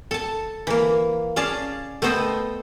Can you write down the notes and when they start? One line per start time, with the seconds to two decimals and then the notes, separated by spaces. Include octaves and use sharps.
0.11 A4 A5
0.67 E3 A#3
1.36 C#4 G#4 D5 F5 A5
2.02 A3 B3 A4 C5 D#5 G5